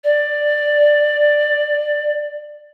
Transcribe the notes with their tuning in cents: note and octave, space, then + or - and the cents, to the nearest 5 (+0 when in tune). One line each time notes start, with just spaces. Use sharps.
D5 +10